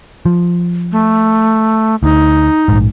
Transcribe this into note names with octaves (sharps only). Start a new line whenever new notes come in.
F3
A3
D2 D#4
A#1 G#2